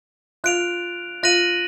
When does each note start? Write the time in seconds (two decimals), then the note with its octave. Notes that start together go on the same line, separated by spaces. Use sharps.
0.44 F4 F#6 D7 F7
1.23 F4 F#6 A#6 D#7 F#7